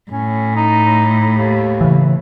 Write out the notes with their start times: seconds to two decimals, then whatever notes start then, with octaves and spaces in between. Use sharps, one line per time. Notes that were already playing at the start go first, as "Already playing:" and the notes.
0.11 A2 C#4
0.56 D#4
1.33 D#2
1.81 C#3 E3